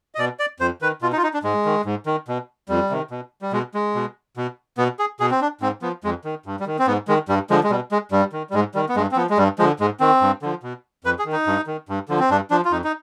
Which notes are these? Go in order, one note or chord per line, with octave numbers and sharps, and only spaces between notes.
D#5
B2 D5
D5
F2 C5
D#3 B4
B2 F4
D#4
F4
D#4
D4
G#2 G#3
D#3
G#2
D#3
B2
F2 G3
C3 D#3
B2
G3
B2 G#3
G#3
B2
B2
B2 B3
G#4
B2 G#4
C4
D4
G#2 C4
F3 B3
F2 G#3
D#3
G2
G3
D#3
C4
G#2 B3
D#3 G#3
G2 G3
D3 F3 G#3
G#3
B2 G3
G#3
G2 G3
D#3
G3
G#2 G#3
D#3 G3
B3
G2 G#3
C4
F3 B3
G#3
G2 G3
D3 F3 G#3
G#2 G#3
D#3 C4
G2
D3 F3
B2
F2 B4
G#4
D#3
D#4
G2
D#3
G2
D3 F3
C4
G2 D4
F3 D4
F4
F2 D#4
D#4